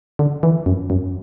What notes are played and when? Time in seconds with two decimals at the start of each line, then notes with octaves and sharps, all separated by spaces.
0.19 D3
0.43 E3
0.66 F#2
0.90 F#2